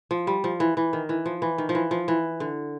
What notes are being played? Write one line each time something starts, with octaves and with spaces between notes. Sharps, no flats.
F3
G3
F3
E3
E3
D#3
E3
F3
E3
D#3
F3
E3
F3
E3
D3